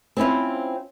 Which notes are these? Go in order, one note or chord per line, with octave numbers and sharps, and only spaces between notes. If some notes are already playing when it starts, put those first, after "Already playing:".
C4 C#4 E4 F4